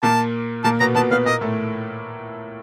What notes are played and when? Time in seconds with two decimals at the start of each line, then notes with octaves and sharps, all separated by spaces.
0.03 A#2 A#3 A5
0.64 A#2 A#3 A5
0.80 B2 B3 A#5
0.95 B2 B3 A5
1.11 B2 B3 F5
1.26 A#2 A#3 D#5
1.41 A2 A3